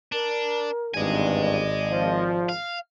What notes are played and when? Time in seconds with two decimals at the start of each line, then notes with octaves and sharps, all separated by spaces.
0.12 D4 A#4
0.94 G#1 E2 G2 D5 D#5 G#5
1.91 F3
2.49 F5